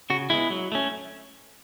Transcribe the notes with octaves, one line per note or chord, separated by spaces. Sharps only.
C#3 F#4
G#3 B3 E4
F#3
A3 C#4